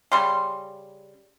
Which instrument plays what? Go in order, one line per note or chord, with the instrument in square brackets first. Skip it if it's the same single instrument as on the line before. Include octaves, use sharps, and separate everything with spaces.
[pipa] C#3 G3 C6